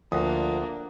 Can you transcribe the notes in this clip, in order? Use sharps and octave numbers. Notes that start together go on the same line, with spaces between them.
D2 F3 A#3 D4 F#5 D#6